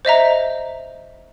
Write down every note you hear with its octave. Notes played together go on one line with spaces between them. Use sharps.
C5 D#5 E5 A#5